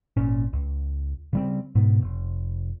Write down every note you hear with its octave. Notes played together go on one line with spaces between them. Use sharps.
G#1 A#2 C#4
C#2
C#3 G3 C4
G#2 B2 B3
F1